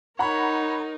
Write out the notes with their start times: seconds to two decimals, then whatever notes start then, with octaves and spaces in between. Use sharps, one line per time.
0.19 D#4 A#4 C#5 F#5 A#5 B5